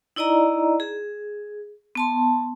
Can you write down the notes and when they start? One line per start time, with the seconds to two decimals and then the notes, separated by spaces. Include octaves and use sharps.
0.16 D#4 E4 D5 D#5 A#5
0.80 G#4
1.95 B3 A5 C6